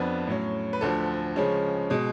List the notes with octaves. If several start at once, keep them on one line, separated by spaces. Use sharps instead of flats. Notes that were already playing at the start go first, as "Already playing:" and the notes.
Already playing: F2 F3 B3 D4 B4
A2 F#3 C#4
B4
D2 D3 F3 A4
C#3 F3 G#3 C#4
B2 G#3